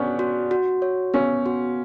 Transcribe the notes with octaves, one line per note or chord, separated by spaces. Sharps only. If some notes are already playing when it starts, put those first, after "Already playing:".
Already playing: B3 C#4 D4 C#5
F#4
F#4
C#5
B3 C#4
F#4